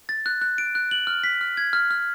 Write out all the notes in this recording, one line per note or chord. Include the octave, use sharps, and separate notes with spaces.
A6
F#6
F#6
D7
F#6
F#7
F6
B6
F6
G#6
F6
F6